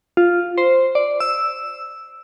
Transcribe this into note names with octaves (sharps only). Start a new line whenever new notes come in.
F4
C5
D5
E6